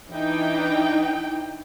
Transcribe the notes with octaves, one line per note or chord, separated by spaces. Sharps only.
E3 D4 D#4 G5